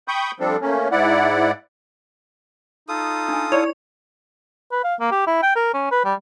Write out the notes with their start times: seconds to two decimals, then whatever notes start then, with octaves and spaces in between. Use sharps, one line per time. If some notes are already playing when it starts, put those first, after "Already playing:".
0.08 G5 B5 C#6 D#6 G6
0.40 F3 G3 C4 D4 A4
0.61 A3 A#3 C#4
0.91 G#2 E4 D5 F#5
2.89 D#4 F4 A4 D#6
3.28 D4 G#5
3.52 E4 C#5 D5
4.72 B4
4.84 F5
5.00 A#3
5.11 G4
5.27 E4
5.43 G5
5.56 A#4
5.74 C#4
5.92 B4
6.05 G3